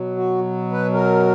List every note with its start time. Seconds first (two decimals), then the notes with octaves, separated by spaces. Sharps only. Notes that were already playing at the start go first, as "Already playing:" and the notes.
Already playing: B2 F#3
0.17 F#4
0.72 B4
0.94 A#4